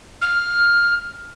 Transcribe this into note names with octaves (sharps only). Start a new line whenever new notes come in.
F6